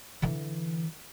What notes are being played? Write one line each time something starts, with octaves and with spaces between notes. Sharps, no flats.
D3 E3